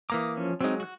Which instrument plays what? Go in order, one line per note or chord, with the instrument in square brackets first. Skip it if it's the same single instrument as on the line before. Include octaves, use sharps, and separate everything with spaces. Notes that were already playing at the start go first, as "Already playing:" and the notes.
[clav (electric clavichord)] E3 A#3 A#5 [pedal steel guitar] D6 D#6
[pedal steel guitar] F3 C#4
[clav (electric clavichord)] F#3 G#3 [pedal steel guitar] C4 D#4
[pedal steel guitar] F#4 F#6